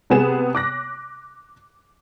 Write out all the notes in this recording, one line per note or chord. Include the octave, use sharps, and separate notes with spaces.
C3 B3 G#4 E7
D6 F#6 A#6